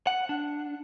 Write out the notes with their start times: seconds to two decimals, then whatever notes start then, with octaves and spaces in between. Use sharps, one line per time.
0.07 F#5
0.29 D4